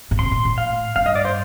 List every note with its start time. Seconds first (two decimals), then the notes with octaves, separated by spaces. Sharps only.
0.11 A#2
0.19 C3 C6
0.31 A#2
0.45 A2
0.58 F5
0.96 G2 F5
1.06 D#5
1.15 D5
1.25 C5